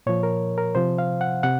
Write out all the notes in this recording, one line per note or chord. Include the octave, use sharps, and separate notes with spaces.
A#2 F3 C#5
A#4
A#4
C3 F3 C5
F5
F#5
C3 F#5